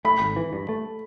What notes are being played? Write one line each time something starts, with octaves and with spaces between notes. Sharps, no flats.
A3 B5
G#1
E3
G2
A3